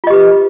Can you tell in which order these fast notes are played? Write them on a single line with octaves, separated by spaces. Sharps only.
F4 D#5 G4 B4